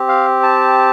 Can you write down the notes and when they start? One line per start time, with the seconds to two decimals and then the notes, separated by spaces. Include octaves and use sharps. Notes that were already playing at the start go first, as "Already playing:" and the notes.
Already playing: C4 G4
0.09 F5
0.43 A5